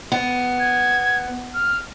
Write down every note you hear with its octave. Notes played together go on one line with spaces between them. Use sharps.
B3
G#6
F6